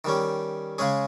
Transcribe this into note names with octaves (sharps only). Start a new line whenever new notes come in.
D#3 G3 C#4
C#3 G#3 C#4 G#4